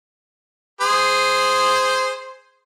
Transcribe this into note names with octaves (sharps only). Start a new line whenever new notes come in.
G#4 C5